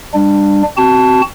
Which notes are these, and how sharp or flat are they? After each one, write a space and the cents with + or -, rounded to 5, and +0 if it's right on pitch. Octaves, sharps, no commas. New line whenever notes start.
G3 +25 D4 +15
C4 +0 F#4 +25 A5 +0